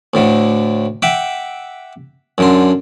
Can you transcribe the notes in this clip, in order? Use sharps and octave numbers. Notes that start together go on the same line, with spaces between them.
D2 A2 D3
E5 F#5 G5 D6
F#2 D3 C6